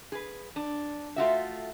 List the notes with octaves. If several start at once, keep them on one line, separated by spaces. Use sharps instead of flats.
G#4 B4
D4
A3 F4 F#4 E5